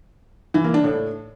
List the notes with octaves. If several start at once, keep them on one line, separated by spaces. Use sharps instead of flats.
E3
A#3
D4
A2